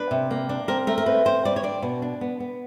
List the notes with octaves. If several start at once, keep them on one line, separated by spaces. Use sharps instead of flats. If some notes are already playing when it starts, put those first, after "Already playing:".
Already playing: D4 B4
C3
A#3
D4
C4 A#4
A3 A#4
A#4
C4 B4
C4 C5
G3 D5
C#5
D4 D5
B2
D4
B3
B3